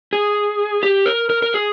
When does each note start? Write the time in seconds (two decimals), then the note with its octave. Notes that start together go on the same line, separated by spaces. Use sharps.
0.13 G#4
0.83 G4
1.06 A#4
1.30 A#4
1.42 A#4
1.54 G#4